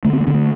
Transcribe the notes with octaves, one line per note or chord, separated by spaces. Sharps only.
D3 A3
C4
A3
D3 C4
A3